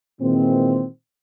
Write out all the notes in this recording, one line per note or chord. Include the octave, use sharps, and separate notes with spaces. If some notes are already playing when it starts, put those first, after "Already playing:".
A#2 D#3 E3 G#3 C4